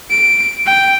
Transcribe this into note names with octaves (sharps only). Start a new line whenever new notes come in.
D7
G5